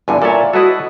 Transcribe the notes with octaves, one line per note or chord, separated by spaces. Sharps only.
E2 G2 D3 G#5
A#2 A4 C#5 D5 E5
E4 F#4 A4 B4 D#5